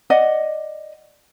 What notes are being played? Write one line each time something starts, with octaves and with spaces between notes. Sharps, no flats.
D5 D#5 F#5